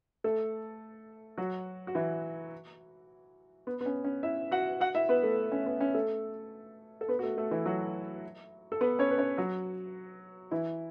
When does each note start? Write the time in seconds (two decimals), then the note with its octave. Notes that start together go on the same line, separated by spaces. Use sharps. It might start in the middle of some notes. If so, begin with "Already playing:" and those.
0.24 A3 A4
1.38 F#3 F#4
1.87 F#4
1.95 E3 E4
3.67 B3
3.81 B3
3.86 C#4
4.04 C#4
4.23 E4 E5
4.52 F#4 F#5
4.81 F#4 F#5
4.95 E4 E5
5.09 B3 B4
5.23 A3 A4
5.52 C#4
5.66 B3
5.81 C#4
5.94 A3 A4
7.01 A4
7.08 B3 B4
7.19 F#4
7.23 A3 A4
7.37 A3 A4
7.51 E3 E4
7.66 F#3 F#4
8.72 A4
8.81 B3 B4
8.99 C#4 C#5
9.11 B4
9.18 C#4 C#5
9.37 F#3 F#4
10.51 E3 E4